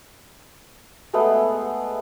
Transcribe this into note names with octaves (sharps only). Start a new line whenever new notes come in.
G#3 A3 B3 G#4